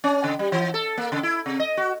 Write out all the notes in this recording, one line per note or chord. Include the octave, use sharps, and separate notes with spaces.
C#4
C#3
G3
E3
A4
A#3
C#3
E4
C3
D#5
F#4